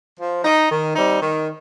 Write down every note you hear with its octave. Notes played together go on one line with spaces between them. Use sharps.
F3
D#4
D#3
G3 C4 D#4
D#3